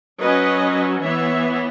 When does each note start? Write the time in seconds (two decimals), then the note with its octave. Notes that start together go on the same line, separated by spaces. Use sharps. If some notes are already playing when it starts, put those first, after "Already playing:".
0.21 F#3 C#4 B4 D#5
1.01 E3 B3 C#5 E5